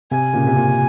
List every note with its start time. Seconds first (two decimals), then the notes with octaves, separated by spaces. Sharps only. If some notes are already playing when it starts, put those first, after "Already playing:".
0.11 C3 G#5
0.33 A#2 C#3
0.47 C3
0.56 A#2